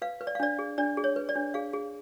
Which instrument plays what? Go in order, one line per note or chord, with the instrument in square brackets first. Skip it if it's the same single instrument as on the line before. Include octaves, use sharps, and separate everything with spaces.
[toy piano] B4 F5
B4
D5
F5
D4 D5
G#4
D4 D5
G#4
C#5
B4
D5
D4
G#4 F5
G#4